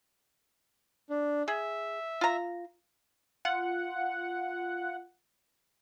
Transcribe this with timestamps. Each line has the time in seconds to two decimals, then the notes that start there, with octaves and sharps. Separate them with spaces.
1.10 D4
1.48 G#4 E5
2.21 F4 A#5
3.45 F4 F#5